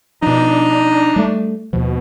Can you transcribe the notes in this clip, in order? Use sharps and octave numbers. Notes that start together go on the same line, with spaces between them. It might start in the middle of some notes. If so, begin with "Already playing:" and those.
B2 F3 D4 D#4
G3 A3
D#2 B2 F3